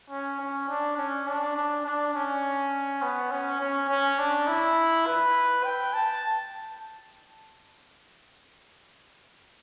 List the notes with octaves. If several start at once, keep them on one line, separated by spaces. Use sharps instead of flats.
C#4
C#4
D4
C#4
D4
D4
D4
C#4
B3
C#4
C#4
C#4
D4
E4
B4
G5
A5